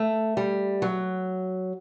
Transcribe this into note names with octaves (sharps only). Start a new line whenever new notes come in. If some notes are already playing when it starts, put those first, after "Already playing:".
Already playing: A3
G3
F#3